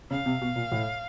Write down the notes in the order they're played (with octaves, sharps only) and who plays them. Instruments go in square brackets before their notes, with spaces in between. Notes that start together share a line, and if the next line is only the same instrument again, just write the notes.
[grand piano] C#3 [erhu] F5
[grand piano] C3
B2
A#2
A2